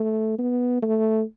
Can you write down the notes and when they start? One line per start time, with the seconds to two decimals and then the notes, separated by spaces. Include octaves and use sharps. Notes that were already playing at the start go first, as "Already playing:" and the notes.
Already playing: A3
0.38 B3
0.82 A3